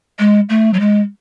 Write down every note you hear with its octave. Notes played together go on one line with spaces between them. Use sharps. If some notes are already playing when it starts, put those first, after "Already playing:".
G#3
A3
F#3
G#3